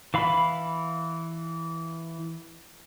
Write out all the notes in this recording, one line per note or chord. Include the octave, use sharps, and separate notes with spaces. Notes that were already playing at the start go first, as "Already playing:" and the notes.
E3 F5 B5